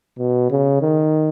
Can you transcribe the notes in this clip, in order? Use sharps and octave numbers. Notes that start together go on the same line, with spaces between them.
B2
C#3
D#3